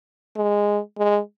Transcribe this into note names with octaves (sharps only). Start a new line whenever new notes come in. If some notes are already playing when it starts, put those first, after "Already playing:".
G#3
G#3